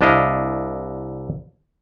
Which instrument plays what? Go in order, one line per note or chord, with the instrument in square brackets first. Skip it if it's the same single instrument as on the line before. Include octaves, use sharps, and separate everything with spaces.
[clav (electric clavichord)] C2 D4 E4 D#5 F5